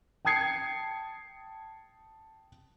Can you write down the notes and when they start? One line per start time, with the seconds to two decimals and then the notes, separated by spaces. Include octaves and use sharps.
0.25 G5 A5 D#6 G#6 C7 C#7